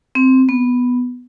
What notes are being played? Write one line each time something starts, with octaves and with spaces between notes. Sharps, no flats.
C4
B3